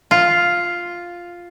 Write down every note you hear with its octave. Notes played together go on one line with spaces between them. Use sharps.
F4